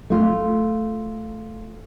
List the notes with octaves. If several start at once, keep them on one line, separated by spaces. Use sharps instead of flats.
A3 F4